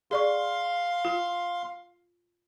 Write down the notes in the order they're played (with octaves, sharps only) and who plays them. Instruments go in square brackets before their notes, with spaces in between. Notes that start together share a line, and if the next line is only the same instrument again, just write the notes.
[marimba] G#4 D5 C#6 [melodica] F5 C6
[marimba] F4